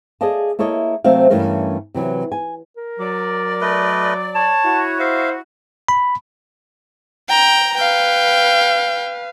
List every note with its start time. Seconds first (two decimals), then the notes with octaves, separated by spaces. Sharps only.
0.21 G#4 A4 D5 D#5 F5 A5
0.59 A#3 E4 A4 C#5 D#5
1.04 C3 F#3 A3 C4 E5 F5
1.30 G2 E3 A3 C#4 A#4 F5
1.94 C3 E3 F#3
2.32 G#5
2.77 A#4
3.00 F#3 D5
3.61 A3 B4 D#5
4.35 C#5 A5
4.65 E4 F#4
5.00 C5 E5 F5
5.88 B5
7.29 G5 A#5
7.76 B4 F5 G5